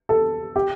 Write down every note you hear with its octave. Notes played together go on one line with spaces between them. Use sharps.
A4
G4